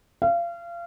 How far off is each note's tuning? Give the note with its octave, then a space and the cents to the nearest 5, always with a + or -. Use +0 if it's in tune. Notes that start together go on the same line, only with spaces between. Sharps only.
F5 -30